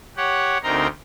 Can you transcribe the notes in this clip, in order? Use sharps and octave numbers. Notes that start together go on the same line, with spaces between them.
G4 C#5 F#5
D2 C4 D#4 A#4 A#5 C6